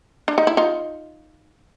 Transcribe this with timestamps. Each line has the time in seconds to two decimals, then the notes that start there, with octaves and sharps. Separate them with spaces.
0.28 D4
0.38 D#4
0.47 E4
0.57 D#4 F4